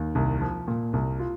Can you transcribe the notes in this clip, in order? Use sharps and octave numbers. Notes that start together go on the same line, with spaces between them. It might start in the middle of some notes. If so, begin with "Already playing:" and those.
Already playing: D#2
C2
F3
A#2
C2
F4